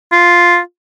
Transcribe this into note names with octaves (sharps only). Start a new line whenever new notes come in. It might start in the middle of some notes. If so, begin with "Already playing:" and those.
F4